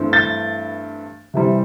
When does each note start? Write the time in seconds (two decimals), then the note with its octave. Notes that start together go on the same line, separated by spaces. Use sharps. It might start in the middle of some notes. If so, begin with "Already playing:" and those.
Already playing: G2 E3 A3 C4
0.13 G6 A6
1.34 C3 E3 G3 C4